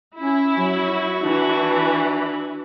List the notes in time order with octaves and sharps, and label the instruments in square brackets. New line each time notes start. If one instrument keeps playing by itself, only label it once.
[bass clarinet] C#4 [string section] E4
[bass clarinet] F#3 [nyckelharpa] F#4
[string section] E3 [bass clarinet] D4